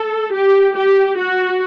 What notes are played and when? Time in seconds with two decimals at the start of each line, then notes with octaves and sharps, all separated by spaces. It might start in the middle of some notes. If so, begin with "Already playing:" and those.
Already playing: A4
0.33 G4
0.75 G4
1.18 F#4